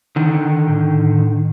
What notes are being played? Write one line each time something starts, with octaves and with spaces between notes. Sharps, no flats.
D3 D#3
A2